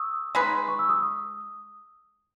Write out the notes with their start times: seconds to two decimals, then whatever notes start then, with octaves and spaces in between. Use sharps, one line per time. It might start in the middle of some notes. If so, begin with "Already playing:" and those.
Already playing: C#6 D#6 E6
0.35 G#3 D#4 G#4 B4
0.68 C#6
0.79 E6
0.89 D#6